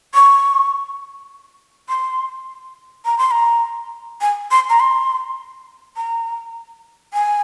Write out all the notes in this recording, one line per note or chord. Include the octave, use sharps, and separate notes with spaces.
C#6
C6
A#5
C6
A#5
G#5
C6
A#5
C6
A#5
G#5